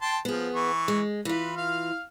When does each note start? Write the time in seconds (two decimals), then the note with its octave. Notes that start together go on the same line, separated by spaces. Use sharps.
0.02 G5 A5 C6
0.25 F3 B3 G#4
0.56 E3 C#6
0.88 G#3
1.25 E3 F4 B4
1.57 F5 F6